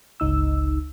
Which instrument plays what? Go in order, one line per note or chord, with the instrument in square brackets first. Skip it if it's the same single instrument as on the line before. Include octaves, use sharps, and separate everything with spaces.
[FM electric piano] G1 C#2 D#4 E6